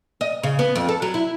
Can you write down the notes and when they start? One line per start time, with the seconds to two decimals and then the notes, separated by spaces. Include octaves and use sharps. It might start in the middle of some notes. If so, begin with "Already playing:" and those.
0.21 D#5
0.43 C#3
0.59 B3
0.76 F2
0.89 A4
1.02 F#3
1.14 E4